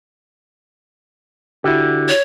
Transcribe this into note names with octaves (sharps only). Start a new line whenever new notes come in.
D3 E4 F#4 G4
C#5